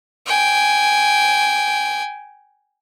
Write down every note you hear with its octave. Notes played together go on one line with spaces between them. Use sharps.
G5 G#5